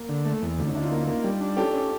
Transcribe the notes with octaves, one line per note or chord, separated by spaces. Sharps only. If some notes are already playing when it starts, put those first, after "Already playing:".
Already playing: A#3
D3
A3
E2
D2 A3
C#4 D#4
D2 D4 E4
D#4 F4
A#3
A#3
G3
D4
C#4 G4 A4
C#4